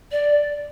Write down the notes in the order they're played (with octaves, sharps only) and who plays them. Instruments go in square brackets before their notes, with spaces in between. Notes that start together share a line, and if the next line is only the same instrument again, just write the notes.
[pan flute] D5